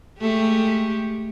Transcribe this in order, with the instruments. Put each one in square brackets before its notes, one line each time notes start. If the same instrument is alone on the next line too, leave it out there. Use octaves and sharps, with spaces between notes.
[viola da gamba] G#3 A3 G4